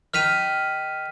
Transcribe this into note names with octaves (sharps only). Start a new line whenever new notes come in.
D#3 F6 B6 D#7